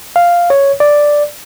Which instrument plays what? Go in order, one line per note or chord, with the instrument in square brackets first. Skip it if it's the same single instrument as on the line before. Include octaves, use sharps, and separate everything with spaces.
[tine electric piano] F5
C#5
D5